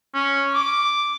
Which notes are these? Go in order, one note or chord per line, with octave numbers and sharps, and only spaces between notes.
C#4
D6